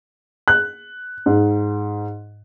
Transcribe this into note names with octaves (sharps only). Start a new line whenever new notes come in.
F#6
G#2